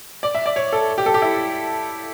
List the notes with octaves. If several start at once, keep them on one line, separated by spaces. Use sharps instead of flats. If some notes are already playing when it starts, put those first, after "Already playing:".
D5
E5
D5
C#5
A4
G4
A4
G4
E4